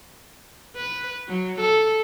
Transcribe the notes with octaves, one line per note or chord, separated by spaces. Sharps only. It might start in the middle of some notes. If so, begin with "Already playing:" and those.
B4
F#3
A4